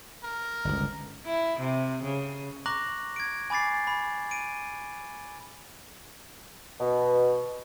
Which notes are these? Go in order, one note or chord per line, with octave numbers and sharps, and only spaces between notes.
A#4
G1 C#2
E4
C3
C#3
A#5 C#6 D6 F#6 A#6 F#7
G#6 D7
G#5 B5 D6 A6 C7
B5
D7 D#7
B2